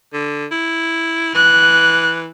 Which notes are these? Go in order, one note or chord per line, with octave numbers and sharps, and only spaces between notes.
D3
E4
E3 F#6